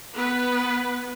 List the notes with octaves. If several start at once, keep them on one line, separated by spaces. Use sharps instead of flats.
B3 B4